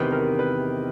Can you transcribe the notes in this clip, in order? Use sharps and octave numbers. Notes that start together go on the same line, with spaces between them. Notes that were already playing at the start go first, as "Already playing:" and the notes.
Already playing: E2 C3 D#3 B4
A#4
B4